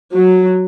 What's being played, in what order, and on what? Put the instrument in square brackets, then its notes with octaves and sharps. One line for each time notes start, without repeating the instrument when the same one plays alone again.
[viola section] F#3